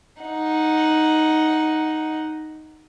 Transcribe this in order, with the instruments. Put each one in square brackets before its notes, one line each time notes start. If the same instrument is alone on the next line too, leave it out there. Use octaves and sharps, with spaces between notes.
[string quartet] D#4 F#5